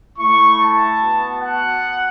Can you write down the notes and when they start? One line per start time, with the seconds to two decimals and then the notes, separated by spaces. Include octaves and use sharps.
0.19 A3 E4 C#6
0.59 A5
1.00 B3 F#4
1.40 F#5